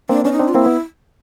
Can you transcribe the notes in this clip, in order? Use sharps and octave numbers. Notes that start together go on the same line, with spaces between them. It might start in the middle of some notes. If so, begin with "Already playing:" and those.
A#3 C4 D4
B3 C#4 D4
D#4
C4 D4
F4
A#3 C4 E4
B3